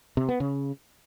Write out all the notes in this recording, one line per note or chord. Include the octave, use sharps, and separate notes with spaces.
C3
B3
C#3